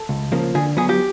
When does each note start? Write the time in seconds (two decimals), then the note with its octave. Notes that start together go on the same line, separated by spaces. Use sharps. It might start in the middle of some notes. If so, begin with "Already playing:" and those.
Already playing: A4
0.09 C#2
0.32 C#3 F3 A#3
0.55 D3 G#4
0.77 F#3 B3 G#4
0.89 G4